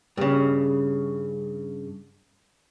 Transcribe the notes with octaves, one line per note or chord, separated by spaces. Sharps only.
G2 C#3